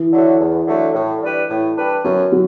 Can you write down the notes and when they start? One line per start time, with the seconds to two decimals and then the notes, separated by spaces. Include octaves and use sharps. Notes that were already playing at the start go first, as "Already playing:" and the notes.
Already playing: E3
0.12 D3 F#3 A3
0.40 E2
0.67 D3 F#3 A3
0.94 A2
1.22 G3 D4 G4 B4
1.50 A2
1.77 G3 D4 G4 B4
2.04 F#2 F#3
2.32 F#3